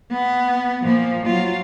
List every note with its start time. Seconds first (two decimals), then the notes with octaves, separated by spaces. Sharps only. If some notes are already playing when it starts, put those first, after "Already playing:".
0.11 B3
0.83 A#2 F3
1.26 F#3 F4